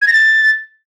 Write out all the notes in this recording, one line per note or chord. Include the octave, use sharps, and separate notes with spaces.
G#6
A#6
A6